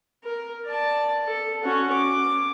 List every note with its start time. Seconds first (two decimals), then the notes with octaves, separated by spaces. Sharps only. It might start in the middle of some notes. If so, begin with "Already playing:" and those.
0.24 A#4
0.66 D5 A5
1.26 A4
1.64 C#4 F#4
1.92 D6